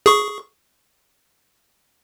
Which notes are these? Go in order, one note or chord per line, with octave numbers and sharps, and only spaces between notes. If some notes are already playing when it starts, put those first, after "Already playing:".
G#4 C#6